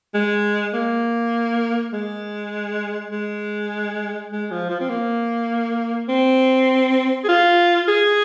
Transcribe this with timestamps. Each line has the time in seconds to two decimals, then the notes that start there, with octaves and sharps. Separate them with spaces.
0.14 G#3
0.74 A#3
1.93 G#3
3.11 G#3
4.31 G#3
4.51 F3
4.70 F3
4.81 C4
4.90 A#3
6.09 C4
7.24 G#4
7.28 F4
7.88 G#4